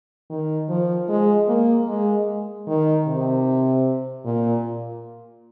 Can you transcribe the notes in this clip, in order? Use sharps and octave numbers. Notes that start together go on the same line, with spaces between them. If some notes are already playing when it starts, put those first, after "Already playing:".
D#3
F3
G#3
A#3
G#3
D#3
C3
A#2